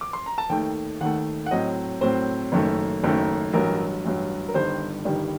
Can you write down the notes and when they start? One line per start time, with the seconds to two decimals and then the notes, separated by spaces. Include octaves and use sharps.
0.01 D6
0.13 C6
0.26 A#5
0.38 A5
0.49 D#2 D#3 A3 G5
1.00 D#2 D#3 A3 F#5
1.46 F#5
1.51 A2 F#3 C4 D#5
2.01 A2 F#3 C4 C5
2.52 F#1 F#2 D#3 A3
3.04 F#1 F#2 D#3 A3
3.53 A1 G2 F#3 A#4
4.04 A1 G2 F#3
4.48 A#4
4.54 G1 G2 D#3 G3 C5
5.05 G1 G2 D#3 G3